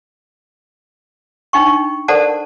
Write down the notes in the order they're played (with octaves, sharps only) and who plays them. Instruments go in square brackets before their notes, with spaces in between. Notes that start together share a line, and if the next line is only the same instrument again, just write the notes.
[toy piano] D4 D#4 G5 C#6
A4 A#4 C5 D5 F#5 A5